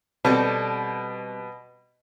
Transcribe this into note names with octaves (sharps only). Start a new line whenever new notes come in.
B2 G3 C4 A4